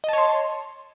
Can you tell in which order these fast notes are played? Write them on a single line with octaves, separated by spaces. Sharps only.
D#5 A5 C#5 C6